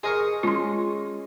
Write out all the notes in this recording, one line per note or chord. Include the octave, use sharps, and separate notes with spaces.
G#4 A#4 C5 D#5 C#6
G#3 C#4 F4 C6